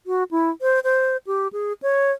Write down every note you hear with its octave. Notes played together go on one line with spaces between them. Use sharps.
F#4
E4
C5
C5
G4
G#4
C#5